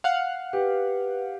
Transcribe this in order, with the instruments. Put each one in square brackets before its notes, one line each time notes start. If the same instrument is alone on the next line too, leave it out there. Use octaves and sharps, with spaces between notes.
[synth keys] F5 F#5
[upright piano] G4 [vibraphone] B4